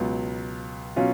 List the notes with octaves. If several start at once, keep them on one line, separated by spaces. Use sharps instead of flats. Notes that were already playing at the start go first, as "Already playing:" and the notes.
Already playing: C#2 B2 F#3 B3
B2 F#3 C#4 F4